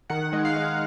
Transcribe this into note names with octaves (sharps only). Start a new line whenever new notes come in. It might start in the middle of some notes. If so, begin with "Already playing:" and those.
D#3 F#5
G#3
F5
G#3